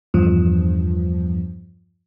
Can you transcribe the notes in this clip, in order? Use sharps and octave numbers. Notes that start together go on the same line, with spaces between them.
E2 G2 F3